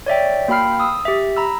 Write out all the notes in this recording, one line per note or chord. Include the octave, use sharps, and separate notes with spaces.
C#5 D5 E5 G5
A#3 F#4 G5 B5 F6 C7
D#6 E6
G4 E5
A#5 B5 E6